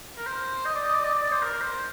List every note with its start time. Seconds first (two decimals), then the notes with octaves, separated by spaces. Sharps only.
0.18 A#4
0.26 C5
0.66 D#5
0.75 D5
0.85 D#5
0.94 D5
1.04 D#5
1.13 D5
1.23 D5
1.32 C5
1.42 A#4
1.61 C5